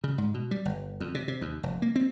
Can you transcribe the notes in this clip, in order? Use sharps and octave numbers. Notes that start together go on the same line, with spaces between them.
C#3
G#2
B2
G3
G1
F2
C3
C3
D#2
F1
A#3
C4